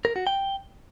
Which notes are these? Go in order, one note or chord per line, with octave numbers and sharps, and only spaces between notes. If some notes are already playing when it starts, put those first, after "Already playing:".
A#4
F#4
G5